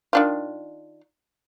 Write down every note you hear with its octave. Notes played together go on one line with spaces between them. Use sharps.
D#3 D4 F4